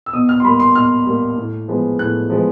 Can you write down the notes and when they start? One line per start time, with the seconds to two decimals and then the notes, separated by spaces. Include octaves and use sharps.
0.06 E6
0.13 B2 D#6
0.29 F6
0.40 C6
0.44 G3 A#3 B5
0.60 C6
0.75 B2 F6
1.06 G3 A#3
1.38 A2
1.68 F3 G#3 B3
1.99 A2 F#6
2.30 F3 G#3 B3